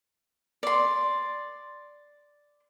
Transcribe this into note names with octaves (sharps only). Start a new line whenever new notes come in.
D5 C6